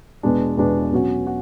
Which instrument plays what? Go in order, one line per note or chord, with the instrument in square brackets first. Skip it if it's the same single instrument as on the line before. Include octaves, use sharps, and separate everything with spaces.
[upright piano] E2 B2 G#3 D4
E2 B2 G#3 D4
B2 F#3 C#4 F#4
F#4